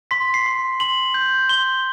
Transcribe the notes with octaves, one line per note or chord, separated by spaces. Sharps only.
C6 B6
C7
C6
C6 F#7
G6
C6 G7